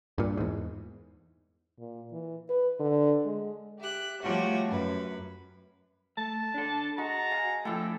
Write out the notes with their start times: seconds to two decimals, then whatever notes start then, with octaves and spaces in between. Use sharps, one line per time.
0.18 G2 A#2
0.37 E2 G#2
1.79 A#2
2.12 E3
2.50 B4
2.80 D3
3.25 G#3
3.81 G4 E5 F#6
4.23 F3 G3 A3 F#4 G4 C#5
4.68 F#2 B4
6.17 A3 A5
6.54 D4 A4
6.98 G#3 F#4 A5 A#5
7.31 F5 G#5
7.65 F3 A3 D4 E4 A4 G5